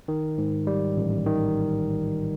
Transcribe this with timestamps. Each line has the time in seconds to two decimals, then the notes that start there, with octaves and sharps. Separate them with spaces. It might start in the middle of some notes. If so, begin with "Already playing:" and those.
0.08 D#3
0.38 G#2
0.67 G3
0.97 A1
1.26 D#3